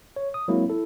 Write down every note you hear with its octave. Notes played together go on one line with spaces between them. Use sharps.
C#5
D#6
F#3 G#3 A#3 C4 E4
E4 A4